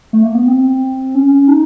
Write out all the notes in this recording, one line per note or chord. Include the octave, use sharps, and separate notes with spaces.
A3
A#3
B3
C4
C#4
D#4